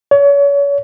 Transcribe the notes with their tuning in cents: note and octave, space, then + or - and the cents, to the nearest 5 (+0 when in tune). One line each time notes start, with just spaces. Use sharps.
C#5 +35